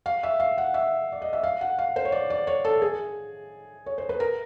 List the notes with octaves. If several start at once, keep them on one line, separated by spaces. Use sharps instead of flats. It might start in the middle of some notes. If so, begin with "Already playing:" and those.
F5
E5
F5
F#5
E5
D5
D#5
E5
F5
F#5
F5
C5
C#5
D5
D5
C#5
A4
G#4
C#5
C5
B4
A#4